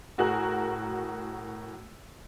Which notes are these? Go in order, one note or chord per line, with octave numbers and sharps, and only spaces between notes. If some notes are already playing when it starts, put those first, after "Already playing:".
A2 F#4 G#4 A#4 F#6